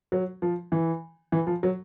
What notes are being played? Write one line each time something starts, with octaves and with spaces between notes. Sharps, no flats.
F#3
F3
E3
E3
F3
F#3